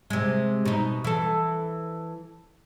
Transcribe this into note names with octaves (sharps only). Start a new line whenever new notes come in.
C3 G#3
B2 D#4
E3 A4